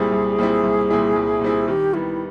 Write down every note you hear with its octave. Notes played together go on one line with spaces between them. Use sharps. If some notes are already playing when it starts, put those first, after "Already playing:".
Already playing: C2 A#2 G3 C4 E4 G#4
C2
A#2 G3 C4 E4
C2
A#2 G3 C4 E4
C2
A#2 G3 C4 E4
D#3 G4
G3 B3 E4